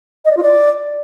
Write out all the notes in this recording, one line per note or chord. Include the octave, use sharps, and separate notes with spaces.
D#5
D5
F4
D5